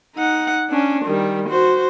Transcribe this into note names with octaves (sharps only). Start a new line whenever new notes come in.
D#4 F#5
C#4 D4
D#3 G3
F#4 C5